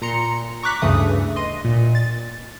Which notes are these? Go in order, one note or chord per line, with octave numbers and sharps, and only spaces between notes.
A#2 A#5 C6 C#7
A#5 C#6 D6 F#6 B6
D2 G2 C#3 E3 A3 D#6
D#5 C6 D#7
A#2
A6